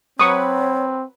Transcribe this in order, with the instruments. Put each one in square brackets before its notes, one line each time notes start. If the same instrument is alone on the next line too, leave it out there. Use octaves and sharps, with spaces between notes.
[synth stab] F#3 B4 [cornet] C4 [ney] C#5 [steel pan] C#6 D#6